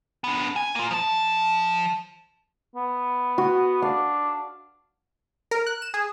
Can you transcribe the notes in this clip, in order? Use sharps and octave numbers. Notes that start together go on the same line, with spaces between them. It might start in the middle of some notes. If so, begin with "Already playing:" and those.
B3 D4
G#5
A#3 F4
F3 A5
B3
F#4
D4 F5
A#4
F#6
E7
G#4